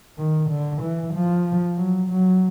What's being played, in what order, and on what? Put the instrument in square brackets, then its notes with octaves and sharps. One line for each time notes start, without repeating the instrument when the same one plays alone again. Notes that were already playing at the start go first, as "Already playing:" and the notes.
[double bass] D#3
D3
E3
F3
F#3
F#3